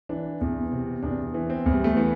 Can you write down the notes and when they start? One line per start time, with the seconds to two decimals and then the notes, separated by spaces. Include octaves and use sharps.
0.09 E3 D4
0.41 E2
0.71 C3
1.02 E2 D4
1.34 E3
1.50 C4
1.66 E2
1.72 G3
1.84 A3
1.97 E3 B3